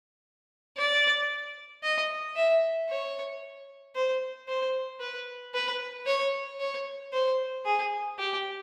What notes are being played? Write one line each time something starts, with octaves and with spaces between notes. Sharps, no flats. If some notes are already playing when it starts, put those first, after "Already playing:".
D5
D#5
E5
C#5
C5
C5
B4
B4
C#5
C#5
C5
G#4
G4